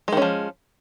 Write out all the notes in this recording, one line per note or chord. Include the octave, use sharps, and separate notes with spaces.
D#3 F3 G#3 C#4